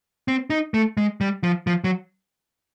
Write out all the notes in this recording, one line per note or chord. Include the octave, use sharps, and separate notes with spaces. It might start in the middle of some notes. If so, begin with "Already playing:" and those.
C4
D#4
A3
G#3
G3
F3
F3
F#3